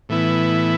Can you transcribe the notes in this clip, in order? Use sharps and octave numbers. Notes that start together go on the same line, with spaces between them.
A2 E3 B3 E4